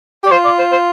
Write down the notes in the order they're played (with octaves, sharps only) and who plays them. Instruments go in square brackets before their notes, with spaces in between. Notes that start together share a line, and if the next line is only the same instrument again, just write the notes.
[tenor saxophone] G4 [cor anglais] D5
[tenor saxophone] F4 [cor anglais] C5
[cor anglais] D5
C5
C5